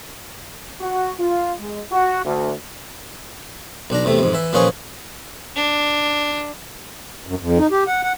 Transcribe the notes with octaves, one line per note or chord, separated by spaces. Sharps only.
F#4
F4
G#3
F#4
D2
B1 D4 A#5
E2 C3 A3
F2 G#2
E3 E5
A#2 E3 F3 C#4 G#4 C#6
D4
F#2
F2
D#4
G4
F#5
F#5